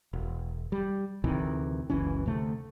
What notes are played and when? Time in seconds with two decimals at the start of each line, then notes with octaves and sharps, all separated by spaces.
0.13 E1
0.72 G3
1.24 D2 C3 D#3 E3
1.90 F#1 C#2 E3 C#4
2.26 D2 C3 A3